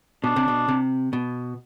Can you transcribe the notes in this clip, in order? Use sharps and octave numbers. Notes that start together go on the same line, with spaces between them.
B2 D4
C3
B2
C3
B2